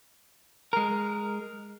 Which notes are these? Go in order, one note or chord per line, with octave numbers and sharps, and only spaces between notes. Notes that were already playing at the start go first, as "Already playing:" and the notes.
G#3 A#4